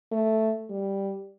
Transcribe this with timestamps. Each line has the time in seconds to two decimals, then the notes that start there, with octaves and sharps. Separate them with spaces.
0.12 A3
0.70 G3